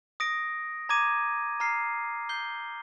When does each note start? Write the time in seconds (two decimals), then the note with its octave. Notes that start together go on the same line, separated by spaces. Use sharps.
0.20 D#6 A#6 D7
0.89 A#5 D6 G#6 D#7
1.60 A#5 F6 C7
2.29 G6 C7 G7